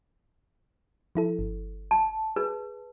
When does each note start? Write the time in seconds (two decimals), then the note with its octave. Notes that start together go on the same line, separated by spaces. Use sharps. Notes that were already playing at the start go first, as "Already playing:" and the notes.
1.15 F3 E4 A4
1.39 G1
1.91 A5
2.36 G#4 B4